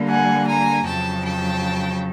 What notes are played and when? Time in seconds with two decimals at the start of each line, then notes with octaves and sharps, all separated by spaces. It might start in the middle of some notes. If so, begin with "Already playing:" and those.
Already playing: D3 G3 A#3
0.08 F#5 G#5
0.47 G#5 A#5
0.86 F2 C#3 F#3 G5 A5
1.25 G5 A5